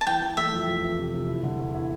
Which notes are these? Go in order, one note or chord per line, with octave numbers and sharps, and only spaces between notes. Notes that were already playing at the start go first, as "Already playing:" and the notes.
A5
E3 G5
E3
A3 E5
F2
F2
E3
C3
C3
E4
D3
E2
E4